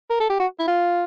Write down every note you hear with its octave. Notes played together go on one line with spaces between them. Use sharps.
A#4
A4
G4
F#4
E4
F4